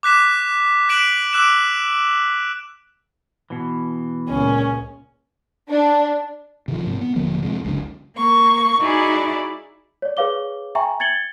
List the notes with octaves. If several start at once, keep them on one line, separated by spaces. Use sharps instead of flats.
D6 F#6 B6 E7
F#6 B6 D7 E7 F#7
D6 E6 F#6 D7 E7
B2 E3
C#2 A#2 C#4
D4
C3 D#3 F3
G#2 C3
B3
D#1 D3 F3 A#3
F2 C3 G#3
F#1 C#2 F#2 D3
A#3 C#6
D#4 E4 F#4 G#4 D5
C#5 D5
G#4 B4 C#5 F5 D6 G7
E5 G5 G#5 A#5 C#6
G#6 A6 C#7 F#7 G7